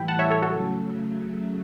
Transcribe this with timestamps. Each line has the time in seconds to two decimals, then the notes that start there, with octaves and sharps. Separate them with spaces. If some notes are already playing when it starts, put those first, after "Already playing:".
Already playing: A2 E3 G3 G5 B5
0.08 F#5 A5
0.19 C#5 E5
0.31 A4 C#5
0.42 C#3 F#3 A3 F#4 A4